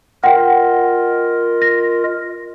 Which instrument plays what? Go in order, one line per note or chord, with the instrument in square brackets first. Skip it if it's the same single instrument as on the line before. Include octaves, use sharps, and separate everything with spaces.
[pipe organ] F4 A#4 D#5 [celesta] F#5 G5
[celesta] A#6